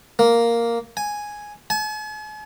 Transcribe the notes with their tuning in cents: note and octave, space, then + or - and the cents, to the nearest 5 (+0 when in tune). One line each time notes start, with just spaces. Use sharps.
A#3 +0
G#5 +0
G#5 +45